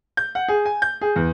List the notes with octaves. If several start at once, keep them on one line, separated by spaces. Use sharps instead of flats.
G6
F#5
G#4
G#5
G6
G#4
E2